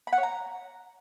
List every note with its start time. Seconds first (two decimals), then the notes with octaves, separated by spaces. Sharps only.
0.07 B5
0.13 F#5
0.18 C#5
0.23 A#5